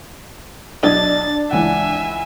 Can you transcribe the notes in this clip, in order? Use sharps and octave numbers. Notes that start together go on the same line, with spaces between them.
B1 D4 D#5 G#6 A6
C#2 E3 E5 F#5 G#5